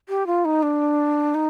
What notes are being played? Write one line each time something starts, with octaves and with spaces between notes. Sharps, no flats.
G4
F4
D#4
D4
D#4